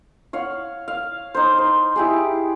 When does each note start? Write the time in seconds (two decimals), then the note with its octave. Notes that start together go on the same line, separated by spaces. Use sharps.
0.33 C#5 F5 F#5
0.88 F5
1.34 D#4 C5
1.58 C5
1.96 E4 G4 G#4